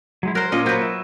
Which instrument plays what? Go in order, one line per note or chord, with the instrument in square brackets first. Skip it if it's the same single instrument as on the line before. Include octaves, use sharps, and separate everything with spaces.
[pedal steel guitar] F#3 G#3 E4
[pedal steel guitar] F#3 F#6 [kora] A#4 C5
[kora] A#2 D#5 [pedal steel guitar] C#4
[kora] F#3 B4 [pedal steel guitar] A#3 C5
[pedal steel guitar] E5